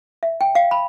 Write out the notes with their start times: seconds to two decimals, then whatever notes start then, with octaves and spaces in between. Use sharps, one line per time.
0.23 E5
0.41 G5
0.55 F5
0.71 B5